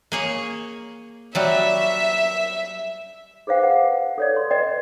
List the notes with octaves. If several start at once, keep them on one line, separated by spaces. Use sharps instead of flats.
A#3 G#4 C#5
F#3 G3 F#4 E5
G#4 B4 C5 F5 G5
B4 F#5
A4 C#5 D5
C6
B4 D5 D#5 G5